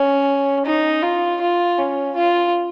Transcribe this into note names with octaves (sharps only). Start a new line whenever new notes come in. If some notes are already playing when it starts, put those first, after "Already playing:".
Already playing: C#4
D#4
F4
F4
C#4
F4